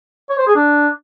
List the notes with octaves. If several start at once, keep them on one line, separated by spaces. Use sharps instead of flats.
C#5
C5
G#4
D4